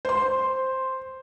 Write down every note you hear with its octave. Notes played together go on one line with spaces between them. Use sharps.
C5 C6